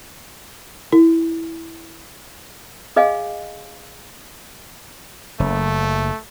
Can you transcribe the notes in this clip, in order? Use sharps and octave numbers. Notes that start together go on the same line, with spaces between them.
E4
G#4 D#5 F5 G#5
F#1 A3